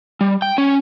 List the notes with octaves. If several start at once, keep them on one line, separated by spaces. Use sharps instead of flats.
G3
G5
C#4